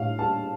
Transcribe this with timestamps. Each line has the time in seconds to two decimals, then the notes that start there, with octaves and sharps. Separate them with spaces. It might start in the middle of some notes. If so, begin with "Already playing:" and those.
Already playing: A2 G3 F5
0.18 G3 A5